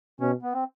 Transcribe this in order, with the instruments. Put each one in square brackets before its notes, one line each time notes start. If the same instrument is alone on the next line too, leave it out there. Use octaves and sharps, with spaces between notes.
[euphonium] B2 [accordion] C#4
[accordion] B3
C4